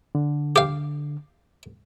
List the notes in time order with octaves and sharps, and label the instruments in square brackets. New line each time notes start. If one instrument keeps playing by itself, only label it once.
[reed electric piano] D3
[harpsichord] G4 F5